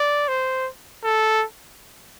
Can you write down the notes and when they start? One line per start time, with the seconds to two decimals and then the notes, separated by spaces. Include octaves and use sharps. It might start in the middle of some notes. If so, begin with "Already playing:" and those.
Already playing: D5
0.28 C5
1.04 A4